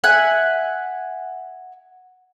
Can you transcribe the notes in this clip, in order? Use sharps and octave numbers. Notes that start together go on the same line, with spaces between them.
E5 F#5 G#5 F#6